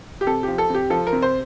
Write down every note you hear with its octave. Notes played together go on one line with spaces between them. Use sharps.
G4
C3 A4
F3 G4
A4
C3 G4
F3 A4
A#4
C3
C5